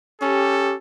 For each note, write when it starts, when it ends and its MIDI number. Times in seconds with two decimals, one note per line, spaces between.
0.22 0.75 61
0.22 0.73 67
0.22 0.77 69